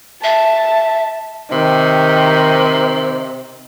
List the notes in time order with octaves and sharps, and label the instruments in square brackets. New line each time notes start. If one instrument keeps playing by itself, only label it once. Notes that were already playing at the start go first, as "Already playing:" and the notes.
[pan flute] E5 [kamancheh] A5
[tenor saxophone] C3 [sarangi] D#3